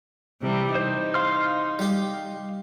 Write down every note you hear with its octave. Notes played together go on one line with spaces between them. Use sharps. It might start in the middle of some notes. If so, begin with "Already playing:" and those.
C3 E3 G3
D#4 C5
F5 C6 F6
G3 G4